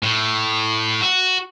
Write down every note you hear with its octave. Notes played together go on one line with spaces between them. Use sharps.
A2
F#4